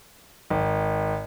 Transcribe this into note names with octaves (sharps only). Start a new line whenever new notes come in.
G#1